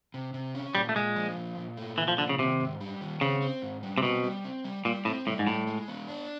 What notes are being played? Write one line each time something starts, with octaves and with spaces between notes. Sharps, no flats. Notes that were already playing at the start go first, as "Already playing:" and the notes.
C3
C3
C#4
A#2 G3
A3
A#2 G#3
F3
A#2
A#2
A3
A#2 E3
F3
D3 F3
C#3
C3 D#3
G#2
G3
D#3
C#3 C4
C4
G#2
G3
C3
B2 C4
G3
C4
G3
A#2 G3
A2 C4
A2 G3
G#2
A2 G3
G#3
B3
D4